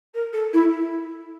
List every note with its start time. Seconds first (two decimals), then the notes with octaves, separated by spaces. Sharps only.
0.14 A#4
0.33 A4
0.53 E4